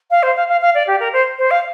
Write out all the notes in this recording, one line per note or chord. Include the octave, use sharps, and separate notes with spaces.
F5
C5
F5
F5
F5
D5
G4
A#4
C5
C5
F5